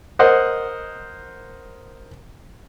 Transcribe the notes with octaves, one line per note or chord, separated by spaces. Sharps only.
A#4 C5 D#5 F#5